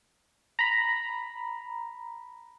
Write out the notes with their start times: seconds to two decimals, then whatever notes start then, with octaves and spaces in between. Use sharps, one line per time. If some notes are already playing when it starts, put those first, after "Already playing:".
0.59 A#5 B5